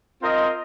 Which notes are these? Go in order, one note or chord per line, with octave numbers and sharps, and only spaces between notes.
C4 F4 A#4 D#5